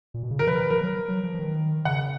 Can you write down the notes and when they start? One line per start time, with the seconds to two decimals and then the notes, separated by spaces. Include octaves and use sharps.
0.14 A#2
0.23 B2
0.31 C#3
0.39 D#3 A#4
0.47 F3 B4
0.59 D#3
0.70 F3 A#4
0.81 F#3
1.08 F#3
1.23 F3
1.34 F3
1.39 D#3
1.85 C#3 F#5